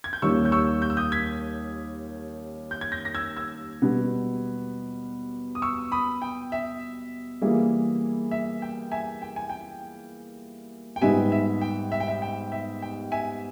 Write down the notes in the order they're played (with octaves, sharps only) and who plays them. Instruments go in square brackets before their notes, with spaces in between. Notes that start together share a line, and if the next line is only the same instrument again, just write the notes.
[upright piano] G#6
G6
[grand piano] D#2 D#3 G3 C#4 [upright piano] C#6 E6
[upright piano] G6
C#6 E6
G6
E6
D#6 G6
G#6 B6
G6
G#6
G6 A#6
A#6
E6 G#6
E6 G#6
[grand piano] B2 G3 B3
[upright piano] D#6
C#6 E6
B5 D#6
G5
E5
[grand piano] E3 G3 A#3 E4 G#4
[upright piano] E5
G5
E5 G#5
G5
G#5
G5
G5
[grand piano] G#2 G3 B3 D#4 G4 [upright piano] E5 G#5
[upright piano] E5
G5
E5
G5
E5
G5
E5
G5
E5 G#5